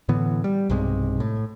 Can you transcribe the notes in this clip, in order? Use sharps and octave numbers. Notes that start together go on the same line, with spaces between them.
A2 D3 E3 B3
G3
B1 G2 C3 G#3
A2